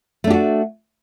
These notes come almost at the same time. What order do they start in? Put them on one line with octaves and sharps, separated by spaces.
A3 D4 G4 F#4